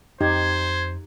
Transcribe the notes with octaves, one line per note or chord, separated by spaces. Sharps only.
F2 D#4 G4 C5 G#6